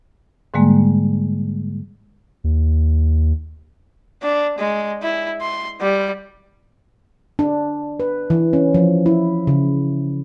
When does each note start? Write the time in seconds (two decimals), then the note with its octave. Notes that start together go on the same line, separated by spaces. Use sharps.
0.54 G#2 D3 G3 G#3 A#3
2.44 D#2
4.23 D4
4.59 G#3
5.02 E4
5.41 C6
5.81 G3
7.39 D4
8.00 B4
8.30 E3
8.53 C#4
8.74 F3
9.06 E4
9.47 C#3